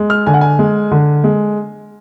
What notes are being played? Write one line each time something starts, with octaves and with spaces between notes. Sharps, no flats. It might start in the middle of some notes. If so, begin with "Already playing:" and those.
Already playing: G#3
F6
D3 G#5
F#5
G#5
G#3
D3
G#3